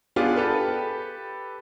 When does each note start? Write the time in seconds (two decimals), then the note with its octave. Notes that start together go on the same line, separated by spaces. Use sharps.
0.16 B3 D4 F4 G4 G#4
0.36 G4 A4 B4